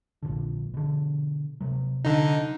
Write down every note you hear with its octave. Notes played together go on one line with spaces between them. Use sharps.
A#1 A#2 D3
B2 D3
C3 F#3
D3 D#4